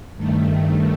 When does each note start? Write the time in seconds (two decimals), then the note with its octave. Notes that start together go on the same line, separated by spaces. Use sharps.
0.16 G2 D#3 A3